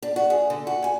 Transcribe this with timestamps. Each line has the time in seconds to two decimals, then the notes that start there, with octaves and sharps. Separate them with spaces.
0.03 D4
0.16 F#4
0.30 G#4
0.50 D3
0.67 F#4
0.84 G#5